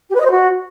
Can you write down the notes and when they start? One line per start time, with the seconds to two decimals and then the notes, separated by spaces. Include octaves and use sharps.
0.09 G4
0.14 B4
0.20 D#5
0.25 C5
0.30 F#4